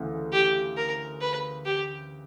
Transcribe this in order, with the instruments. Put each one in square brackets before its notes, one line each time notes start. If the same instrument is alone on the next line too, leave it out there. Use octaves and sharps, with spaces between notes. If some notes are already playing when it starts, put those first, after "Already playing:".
Already playing: [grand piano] D2 C#3 E3
[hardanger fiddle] G4
A#4
B4
G4